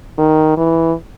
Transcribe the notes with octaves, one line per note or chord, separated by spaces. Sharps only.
D#3
E3